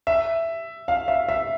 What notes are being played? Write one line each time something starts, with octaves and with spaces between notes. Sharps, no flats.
E5
F5
E5
E5